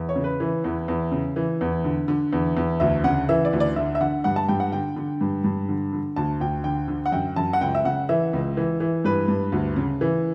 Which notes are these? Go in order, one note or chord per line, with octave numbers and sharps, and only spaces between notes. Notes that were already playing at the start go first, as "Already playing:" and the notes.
Already playing: E2
C#5
C#3
B4
E3
E2
E2
C#3
E3
E2
D3
D3
E2
E2
D2 E5
C#3 F#5
E3 E5
D5
D2
D5
D3 E5
E5
D3 F#5
G2 F#5
A5
G2 G5
F#5
D3 G5
D3
G2
G2
D3
D3
D2 A5
D2 G5
D3 G5
D3
F#5
F#2 G5
F#2 A5
F#5
C#2 G5
E5
C#3 F#5
E3 E5
C#2
E3
E3
G2 B4
G2
D2
C#3
E3